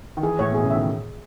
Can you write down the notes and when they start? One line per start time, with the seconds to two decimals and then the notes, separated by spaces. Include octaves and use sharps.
0.17 D#3
0.23 E3 G#4
0.39 A2 C#5
0.52 B2 G#4
0.63 C#3
0.70 D#3 E5